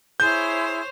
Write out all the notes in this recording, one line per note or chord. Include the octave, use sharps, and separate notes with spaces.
E4 G#4 C5 C#5 G6